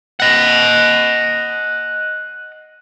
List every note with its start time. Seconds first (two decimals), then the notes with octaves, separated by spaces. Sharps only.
0.20 D#5 F#5